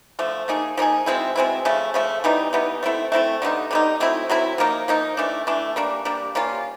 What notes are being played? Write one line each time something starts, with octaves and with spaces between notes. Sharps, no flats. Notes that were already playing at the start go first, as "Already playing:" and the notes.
D3 F3 A3
F3 A#3 D#4 G#4
F3 A#3 D#4 G#4
B2 G#3 C4 E4
B2 G#3 C4 E4
C#3 F3 A3
C#3 F3 A3
E3 G3 B3 D#4
E3 G3 B3 D#4
A3 C4 E4 A4
A3 C4 E4 A4
D3 G3 B3 D#4
D3 G3 B3 D#4
F#3 A3 C4 E4
F#3 A3 C4 E4
F3 A#3 D#4
F3 A#3 D#4
E3 A3 D4
E3 A3 D4
G3 A#3 D4
G3 A#3 D4
G3 A#3 C#4 F4